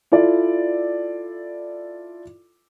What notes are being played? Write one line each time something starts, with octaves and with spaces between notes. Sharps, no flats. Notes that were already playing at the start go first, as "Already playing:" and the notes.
E4 F4 A4 D5